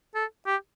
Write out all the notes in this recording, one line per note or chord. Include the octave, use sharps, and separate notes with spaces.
A4
G4